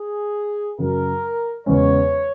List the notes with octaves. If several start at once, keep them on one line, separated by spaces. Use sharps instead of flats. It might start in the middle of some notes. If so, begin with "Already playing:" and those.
Already playing: G#4
F#2 C#3 F#3 A#4
E2 C#3 G#3 C#4 C#5